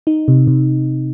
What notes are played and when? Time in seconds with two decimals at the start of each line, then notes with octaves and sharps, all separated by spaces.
0.07 D#4
0.28 C3
0.47 C3